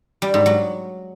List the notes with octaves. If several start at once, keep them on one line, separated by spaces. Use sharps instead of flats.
G3
G#2
F#3